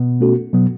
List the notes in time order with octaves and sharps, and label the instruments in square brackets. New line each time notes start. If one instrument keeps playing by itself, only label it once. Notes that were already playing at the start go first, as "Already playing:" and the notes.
Already playing: [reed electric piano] B2 B3
[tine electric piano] A3 C#4 F#4 A4
[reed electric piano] B2 B3 [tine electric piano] F#3